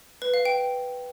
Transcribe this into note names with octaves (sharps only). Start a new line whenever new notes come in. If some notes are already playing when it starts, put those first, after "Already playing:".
B4
F5
G5